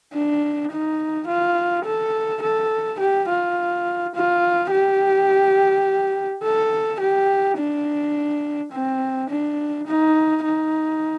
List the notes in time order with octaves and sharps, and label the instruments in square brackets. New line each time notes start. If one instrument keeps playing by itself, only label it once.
[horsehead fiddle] D4
D#4
F4
A4
A4
G4
F4
F4
G4
A4
G4
D4
C4
D4
D#4
D#4